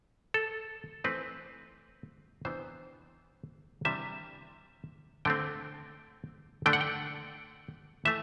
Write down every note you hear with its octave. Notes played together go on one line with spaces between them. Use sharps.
A4
E3 A3 C4 B4
C3 E3 B3 D4 C5
C3 E3 G3 D4 E5
D3 A3 C4 G5
D3 A3 D4 G5
F#5
G5
E3 A3 E5